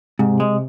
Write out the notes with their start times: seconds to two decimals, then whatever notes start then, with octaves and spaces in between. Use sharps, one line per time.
0.19 G#2 C3
0.40 G#3